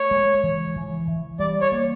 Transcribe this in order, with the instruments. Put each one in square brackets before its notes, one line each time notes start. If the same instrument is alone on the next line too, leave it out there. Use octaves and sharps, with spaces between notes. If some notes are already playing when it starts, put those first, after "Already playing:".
Already playing: [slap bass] A3 [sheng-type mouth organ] C#5
[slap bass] G#3
E3
E3
E3
[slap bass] G3 [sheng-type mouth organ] D5
[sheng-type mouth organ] C#5
[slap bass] A#3